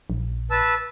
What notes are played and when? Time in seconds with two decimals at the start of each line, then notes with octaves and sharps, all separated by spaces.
0.10 A#1
0.51 B4 A5 E6